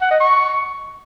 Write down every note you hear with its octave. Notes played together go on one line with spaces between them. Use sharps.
F#5
D#5
C#6